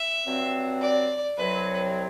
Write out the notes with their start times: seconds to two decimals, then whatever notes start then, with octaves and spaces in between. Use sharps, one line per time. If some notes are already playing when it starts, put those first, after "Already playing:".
Already playing: E5
0.26 G2 F#3 C4
0.82 D5
1.37 C2 C3 F#3 C4 B4